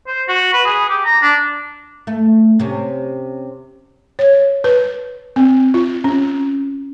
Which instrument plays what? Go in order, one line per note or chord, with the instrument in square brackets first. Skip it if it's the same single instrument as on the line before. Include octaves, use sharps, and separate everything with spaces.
[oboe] C5
F#4
B4
G#4
G4
A#5
D4
[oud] A3
C3 C#4
[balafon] C#5
B4
C4
F4
C#4